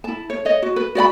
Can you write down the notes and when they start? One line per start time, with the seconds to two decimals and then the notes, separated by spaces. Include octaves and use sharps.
0.04 E4 A5
0.30 C#5
0.45 C#5 D#5
0.62 F#4
0.76 B4
0.95 F#4 D5 F#5 B5